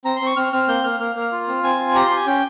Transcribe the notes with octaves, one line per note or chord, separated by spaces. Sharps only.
C4 A#5
C6
C4 C#6
C4 F6
C4 F6
A#3 G6
A#3 F6
A#3 F6
A#3
F6
F4
C4
C4 G#5
F4
G4 A#5
C6
G4
G#5
C#4 G5